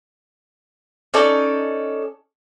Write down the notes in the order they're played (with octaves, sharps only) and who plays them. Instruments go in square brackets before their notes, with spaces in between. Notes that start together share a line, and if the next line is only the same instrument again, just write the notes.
[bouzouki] C#4 D#4 A4 D5